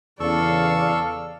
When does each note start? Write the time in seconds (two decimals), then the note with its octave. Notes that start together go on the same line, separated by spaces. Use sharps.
0.20 E2 C#3 A4 D5 F5 C#6 E6